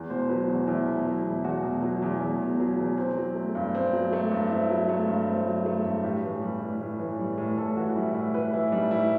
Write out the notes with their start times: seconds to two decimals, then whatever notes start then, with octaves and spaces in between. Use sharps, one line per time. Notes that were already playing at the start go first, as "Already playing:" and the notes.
Already playing: E2
0.10 B2 C5
0.29 F#3 B4
0.48 E2 F#4
0.67 E2 E4
0.87 B2
1.06 F#3 E4
1.25 E2
1.44 E2 F#4
1.63 B2
1.82 F#3
2.02 E2
2.21 E2
2.40 B2
2.60 F#3
2.79 E2
2.98 C4
3.17 F#3
3.35 A3
3.55 G2
3.75 C4
3.93 F#3
4.13 A3
4.31 G2
4.51 C4 E4
4.70 F#3
4.89 A3
5.08 G2
5.28 C4
5.47 F#3
5.66 A3
5.85 G2
6.03 A2 G4
6.24 E3
6.42 G3
6.61 A2
6.80 A2
7.00 E3
7.19 G3
7.38 A2
7.57 A2 A4
7.77 E3 F#4
7.96 G3 E4
8.14 A2 E4
8.34 A2 B4
8.53 E3 E4
8.72 G3 D#4
8.91 A2 E4